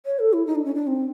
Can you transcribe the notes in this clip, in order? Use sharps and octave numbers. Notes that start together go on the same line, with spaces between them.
C#5
A4
E4
D#4
D4
C#4
D4
C4